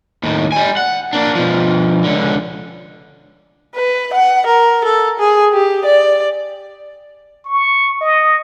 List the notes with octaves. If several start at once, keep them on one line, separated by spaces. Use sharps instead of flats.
D#2 A2
G3 G#5
F#5
A#3 D4
B2 F3
C#2 D3
B4
F#5
A#4
A4
G#4
G4
D5
C#6
D#5